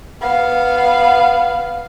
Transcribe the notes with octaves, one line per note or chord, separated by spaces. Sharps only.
B3 F5